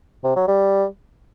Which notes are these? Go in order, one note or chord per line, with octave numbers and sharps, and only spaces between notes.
C3
F#3
G3